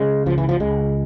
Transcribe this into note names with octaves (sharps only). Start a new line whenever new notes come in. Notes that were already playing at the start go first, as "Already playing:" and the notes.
Already playing: C#3 G#3
C#2 F3
E3
F3
C#2 G#3